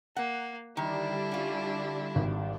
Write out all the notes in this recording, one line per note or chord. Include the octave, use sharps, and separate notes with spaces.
A#3 F#5
D3 D#3 G3 D4 E4
C#4 F4
G#1